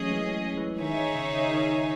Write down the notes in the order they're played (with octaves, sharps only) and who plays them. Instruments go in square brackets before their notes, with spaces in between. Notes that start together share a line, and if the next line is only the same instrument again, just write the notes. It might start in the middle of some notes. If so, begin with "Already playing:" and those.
Already playing: [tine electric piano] E3 F#3 A3 [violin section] C#4 G#4 D#5
[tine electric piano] E3 G#3
E3 G#3
[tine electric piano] D#3 [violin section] D#4 G#4 C#5 E5
[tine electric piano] C#3
D#3